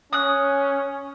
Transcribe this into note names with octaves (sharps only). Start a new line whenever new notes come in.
C#4 D#6 F#6